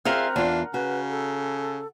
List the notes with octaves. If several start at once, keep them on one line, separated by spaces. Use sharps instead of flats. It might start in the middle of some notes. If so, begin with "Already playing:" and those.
C4 F4 G#4 A#4 E5 F#5 F6
E2 D4 F4
C#3 F#4 B4
A4